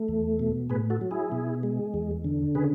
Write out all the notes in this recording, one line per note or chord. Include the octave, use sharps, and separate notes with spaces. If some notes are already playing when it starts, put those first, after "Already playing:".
Already playing: A3
E2
B2
A2 G#4 B4
F#4 A4
F#3
E4 G#4
B2
G#3
E2
D3
C#3 G#4 B4